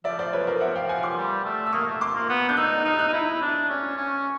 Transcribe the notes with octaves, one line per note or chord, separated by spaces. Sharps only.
F3 D5 E5
C5 D5
B4 C#5
A#4 C5
E5 F#5
F5 G5
F#5 G#5
C6 D6
G3
A3
E6
A#3 C#6 D#6
A3
C6 D6
A#3
B3
D4 G6
D#4 E6 F#6
D#4 D#6 F6
E6 F#6
D#4
E4
D4
C#4
C#4